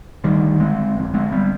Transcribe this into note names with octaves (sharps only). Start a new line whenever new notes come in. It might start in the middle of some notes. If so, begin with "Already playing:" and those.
D2 D3 D#3 G3
G#3 C4
G1 F2 D3
G#3 C4
G3 B3